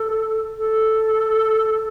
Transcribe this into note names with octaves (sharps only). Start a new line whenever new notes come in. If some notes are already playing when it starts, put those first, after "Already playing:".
Already playing: A4
A4